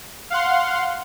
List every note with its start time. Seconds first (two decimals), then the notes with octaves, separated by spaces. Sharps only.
0.30 F5 F#5 C6